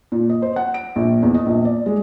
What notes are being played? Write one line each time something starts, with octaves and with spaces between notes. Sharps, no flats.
A#2
D#5
C5
F#5
D7
A#1
E2
D#5
A#1
D5
G#3